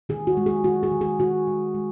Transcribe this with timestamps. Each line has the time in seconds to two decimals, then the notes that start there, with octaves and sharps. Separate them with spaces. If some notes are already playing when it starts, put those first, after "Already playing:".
0.09 D#3 G#4
0.27 F#4
0.37 G#3
0.46 G#4
0.64 D#3 F#4
0.83 G#4
0.92 D#3
1.01 G#4
1.19 D#3 F#4
1.47 G#3
1.75 G#3